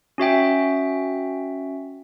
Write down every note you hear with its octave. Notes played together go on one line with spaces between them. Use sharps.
C#4 F#4 E5 G5